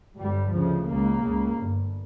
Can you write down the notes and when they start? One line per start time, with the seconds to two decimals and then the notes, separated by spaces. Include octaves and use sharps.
0.16 G1 G2 G3
0.52 D2 C#3 F3
0.88 C#2 C#3 A#3
1.23 C#2 C#3
1.59 G1 G2